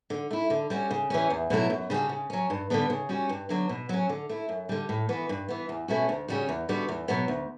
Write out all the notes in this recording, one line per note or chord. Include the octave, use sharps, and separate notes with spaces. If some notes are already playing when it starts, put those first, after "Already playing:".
D3
A3 E4
D3
G3 C#4 F#4
C#3
E3 G3 C#4
E2
B2 F#3 A3 E4
F#2
C#3 G3 D4 F#4
C#3
F#3 C#4
G2
D3 G3 B3 D4
C#3
G3 C#4 F#4
G2
D3 F#3 B3 D4
B2
F#3 C#4
D3
A3 E4
F#2
D3 G3
A2
E3 B3 F#4
G2
E3 B3
E2
B2 A3 C#4 F#4
D2
C#3 G3 C#4 F#4
E2
D3 G3 B3 F#4
E2
B2 F#3 B3
D2